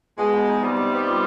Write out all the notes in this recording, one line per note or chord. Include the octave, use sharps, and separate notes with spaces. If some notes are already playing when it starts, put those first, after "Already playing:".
B2 G#3
B2
D#4
C3 G3
C3
B3
F4